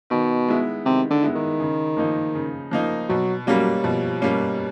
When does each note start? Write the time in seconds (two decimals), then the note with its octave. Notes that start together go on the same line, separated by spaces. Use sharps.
0.10 B2 D#3
0.48 G#3 B3 E4
0.85 C3 D#3
1.10 D3
1.23 G#3 B3 E4
1.35 D#3
1.60 C#3
1.97 F3 A#3 D#4
2.35 C#3
2.71 F3 A#3 D#4
3.09 B2 F#3
3.46 F#3 G3 A#3 C#4
3.84 B2 F3
4.22 G3 A#3 C#4